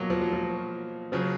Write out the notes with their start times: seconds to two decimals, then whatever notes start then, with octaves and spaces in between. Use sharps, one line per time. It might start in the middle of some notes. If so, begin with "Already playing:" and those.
Already playing: B2 F#3 A#3 F4 A#4
0.10 F3
0.21 F#3
0.33 F3
1.12 C#3 F3 F#3 C#4